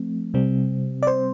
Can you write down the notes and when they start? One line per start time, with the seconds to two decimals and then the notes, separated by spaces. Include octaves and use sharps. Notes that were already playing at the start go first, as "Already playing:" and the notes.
Already playing: F3 A3 C4
0.34 C3 G3 C4
1.03 D5
1.07 C5